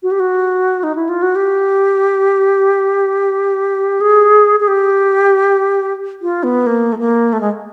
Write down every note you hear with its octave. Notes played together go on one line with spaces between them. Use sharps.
F#4
G4
F#4
D#4
E4
F4
F#4
G4
G#4
G#4
G4
F4
B3
A#3
A3
A#3
A3
G#3